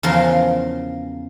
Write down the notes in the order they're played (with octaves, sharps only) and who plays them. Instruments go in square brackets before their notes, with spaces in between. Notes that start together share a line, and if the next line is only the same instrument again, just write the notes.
[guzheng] E2 C#3 F3 A#4 C6